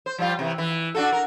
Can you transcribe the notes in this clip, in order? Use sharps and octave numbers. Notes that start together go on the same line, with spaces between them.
C5
F3 G3 F4
C3 E3
E3
D4 F#4 A4
A#4